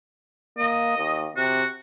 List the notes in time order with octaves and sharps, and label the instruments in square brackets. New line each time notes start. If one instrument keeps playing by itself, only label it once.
[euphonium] A#3 [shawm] D#5
[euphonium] D#2
[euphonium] C3 [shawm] F#4